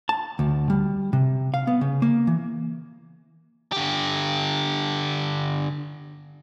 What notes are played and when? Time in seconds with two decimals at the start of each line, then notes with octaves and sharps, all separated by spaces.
0.09 A5
0.39 D2
0.70 G3
1.13 C3
1.54 F5
1.67 B3
1.81 C#3
2.02 A#3
2.27 E3
3.72 D3 G4